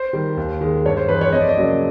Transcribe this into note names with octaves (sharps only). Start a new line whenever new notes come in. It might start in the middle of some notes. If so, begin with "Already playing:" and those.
Already playing: C5
D#3 G3
D#2
D#3 G#3
G2 C#5
C5
E3 G#3 B4
C#5
F2 D#5
D5
D#5
C#3 F#3 A#3